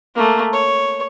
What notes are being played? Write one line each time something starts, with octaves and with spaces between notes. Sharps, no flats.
A3 A#3
C#5